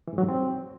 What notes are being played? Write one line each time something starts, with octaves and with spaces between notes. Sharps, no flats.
E3
G#2
F#3
G#2
C4